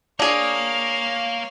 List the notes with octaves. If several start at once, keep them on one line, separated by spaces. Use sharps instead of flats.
A#3 D4 G#4 C#5 F5